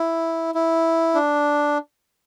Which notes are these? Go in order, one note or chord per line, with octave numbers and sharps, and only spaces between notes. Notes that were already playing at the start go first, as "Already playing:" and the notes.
Already playing: E4
E4
D4